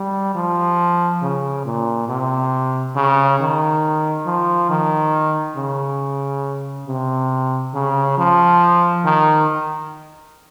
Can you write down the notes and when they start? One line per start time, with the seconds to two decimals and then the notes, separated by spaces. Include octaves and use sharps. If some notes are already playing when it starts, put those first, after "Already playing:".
Already playing: G3
0.35 F3
1.22 C#3
1.66 A#2
2.09 C3
2.96 C#3
3.40 D#3
4.26 F3
4.70 D#3
5.56 C#3
6.87 C3
7.74 C#3
8.18 F3
9.05 D#3